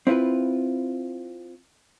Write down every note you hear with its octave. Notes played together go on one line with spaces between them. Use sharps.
C4 E4 F4 B4